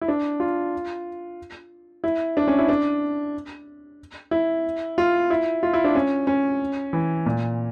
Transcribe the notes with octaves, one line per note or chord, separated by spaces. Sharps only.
E4
D4
F4
E4
D4
C#4
E4
D4
E4
F4
E4
F4
E4
D4
C#4
C#4
E3
A#2